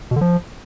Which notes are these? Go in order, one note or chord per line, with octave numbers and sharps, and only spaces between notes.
B2
D3
F3